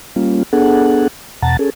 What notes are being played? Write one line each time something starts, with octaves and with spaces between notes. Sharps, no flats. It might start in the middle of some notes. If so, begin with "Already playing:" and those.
G3 A#3 C#4 F4
B3 D4 G#4 A4 F#5
E2 B2 F#5 A5 A#5 A6
C#4 G#4 A4